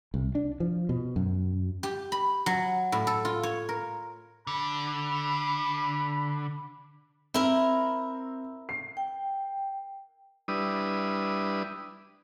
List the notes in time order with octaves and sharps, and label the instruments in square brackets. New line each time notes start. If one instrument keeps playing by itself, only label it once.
[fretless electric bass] C2
D4
F3
B2
F#2
[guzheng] G4
B5
F#3
A2
A4
F4
C#5
A#4
[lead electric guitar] D3 [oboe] B5
[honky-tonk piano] C4 [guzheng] E4 A#4
[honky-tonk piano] C7
[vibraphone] G5
[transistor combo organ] G3 D4 E4 B4 D#6